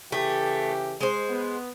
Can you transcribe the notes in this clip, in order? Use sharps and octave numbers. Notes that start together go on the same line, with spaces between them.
C#3 E3 A3 G4
G#3 C5
B3